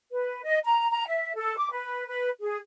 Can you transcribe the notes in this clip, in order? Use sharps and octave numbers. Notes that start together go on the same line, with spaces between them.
B4
D#5
A#5
A#5
E5
A4
D6
B4
B4
G#4